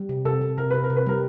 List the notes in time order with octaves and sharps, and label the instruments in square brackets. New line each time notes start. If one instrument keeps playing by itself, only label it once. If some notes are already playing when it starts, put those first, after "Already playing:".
Already playing: [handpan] G3
C3
[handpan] C3 [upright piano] A4
[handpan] C3
[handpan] C3 [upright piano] A#4
[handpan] C3 [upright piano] B4
[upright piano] A#4
[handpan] C3
[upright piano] B4
[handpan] G3 [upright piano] A#4